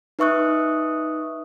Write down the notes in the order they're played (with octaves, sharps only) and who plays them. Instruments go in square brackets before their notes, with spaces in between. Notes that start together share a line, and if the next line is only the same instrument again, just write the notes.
[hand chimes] D#4 B4 E5 C#6 D#6 F#6